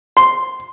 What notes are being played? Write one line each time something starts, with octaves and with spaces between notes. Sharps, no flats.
C6